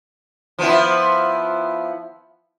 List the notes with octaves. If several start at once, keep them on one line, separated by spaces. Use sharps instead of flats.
F3 B3 E4